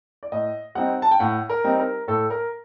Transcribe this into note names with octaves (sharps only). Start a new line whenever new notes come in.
D5
A2 D#5
G3 C4 D#4 F#5
A5
G5
A2 F#5
A#4
G3 C4 D#4
A#4
A2 A4
A#4